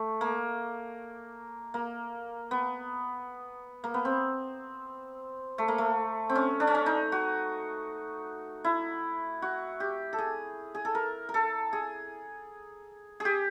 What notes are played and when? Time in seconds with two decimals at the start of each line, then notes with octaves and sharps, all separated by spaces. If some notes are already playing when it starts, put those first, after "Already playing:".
Already playing: A3
0.21 A#3
1.74 A#3
2.51 B3
3.84 A#3
3.94 B3
4.05 C4
5.58 A3
5.68 A#3
5.78 A3
6.30 C4
6.35 C#4
6.60 D4
6.67 C#4
6.75 D4
6.86 D#4
7.12 F#4
8.64 E4
9.42 F#4
9.80 G4
10.13 A4
10.18 G#4
10.75 G#4
10.85 A4
10.95 A#4
11.29 A#4
11.34 A4
11.73 G#4
13.20 G4 G#4